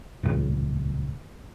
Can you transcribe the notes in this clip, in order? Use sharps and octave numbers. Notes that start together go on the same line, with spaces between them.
D#1 C#2